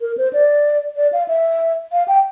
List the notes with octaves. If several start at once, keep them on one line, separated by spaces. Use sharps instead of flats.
A#4
C5
D5
D5
F5
E5
F5
G5